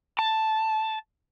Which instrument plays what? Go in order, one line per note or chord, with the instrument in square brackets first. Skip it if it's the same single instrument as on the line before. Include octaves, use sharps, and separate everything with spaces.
[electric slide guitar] A5